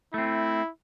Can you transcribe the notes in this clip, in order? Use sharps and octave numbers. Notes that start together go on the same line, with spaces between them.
A3 C4 E4